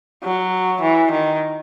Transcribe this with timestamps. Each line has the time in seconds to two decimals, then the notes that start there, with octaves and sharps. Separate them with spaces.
0.24 F#3
0.81 E3
1.11 D#3